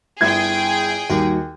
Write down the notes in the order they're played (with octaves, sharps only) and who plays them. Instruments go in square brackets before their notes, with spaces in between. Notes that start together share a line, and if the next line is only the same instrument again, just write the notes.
[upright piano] G1 E4 G#6 [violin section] G#4 G5 G#5
[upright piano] D#2 [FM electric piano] G3 D#4 F#4